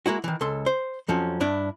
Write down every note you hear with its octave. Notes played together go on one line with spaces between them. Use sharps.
G#3 A#3 E4 F#4
D#3 E3
C#2 A4 C6
C5
F2 F3 F#3 C#4
G2 D4 E4